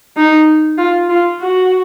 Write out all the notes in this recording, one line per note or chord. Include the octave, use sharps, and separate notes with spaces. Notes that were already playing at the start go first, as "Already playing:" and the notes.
D#4
F4
F4
F#4